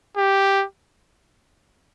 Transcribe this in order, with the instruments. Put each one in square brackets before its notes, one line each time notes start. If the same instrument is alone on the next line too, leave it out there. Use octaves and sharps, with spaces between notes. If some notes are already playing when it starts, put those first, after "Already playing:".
[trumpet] G4